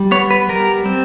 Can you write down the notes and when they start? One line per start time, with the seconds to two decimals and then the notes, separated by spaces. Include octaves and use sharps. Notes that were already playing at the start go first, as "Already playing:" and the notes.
Already playing: G3
0.11 B3 C#5
0.31 B4
0.49 G3 A#4
0.86 C4